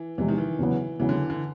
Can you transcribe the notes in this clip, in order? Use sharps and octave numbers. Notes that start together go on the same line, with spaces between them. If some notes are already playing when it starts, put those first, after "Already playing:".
Already playing: E3
E2 C3 E3 F3 G#3
D#3
E3
E2 C#3 F#3 B3
E2 C#3 E3 F#3 B3
D3
D3